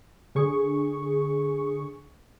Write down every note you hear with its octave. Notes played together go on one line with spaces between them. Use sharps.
D3 G#4 C#6